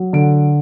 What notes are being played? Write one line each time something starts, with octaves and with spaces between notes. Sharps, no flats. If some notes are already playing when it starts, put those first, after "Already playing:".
Already playing: F#3
D3 D7